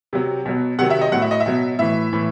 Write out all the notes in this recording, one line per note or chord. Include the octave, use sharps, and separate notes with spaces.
C3 F#3
B2 F#3
C3 D#3 F#3 F#5
E5
D#5
A2 F#3 F#5
E5
D#5
E5
B2 F#3
A2 E3 E5
A2 E3